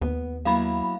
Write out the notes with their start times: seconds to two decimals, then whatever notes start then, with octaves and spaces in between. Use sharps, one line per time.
0.01 D#2 B3
0.45 F#3 A#3 E4 F5 B5